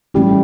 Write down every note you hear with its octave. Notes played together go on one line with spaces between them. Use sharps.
E3 G3 A3 C#4 E4